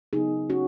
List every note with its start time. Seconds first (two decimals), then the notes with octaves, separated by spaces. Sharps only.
0.13 C#3 F#3 B3 D#4 G#4
0.50 C#4 F#4